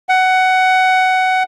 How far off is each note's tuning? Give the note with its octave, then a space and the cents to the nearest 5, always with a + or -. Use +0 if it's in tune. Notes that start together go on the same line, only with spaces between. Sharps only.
F#5 +15